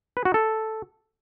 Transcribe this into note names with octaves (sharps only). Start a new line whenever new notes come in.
B4
F#4
A4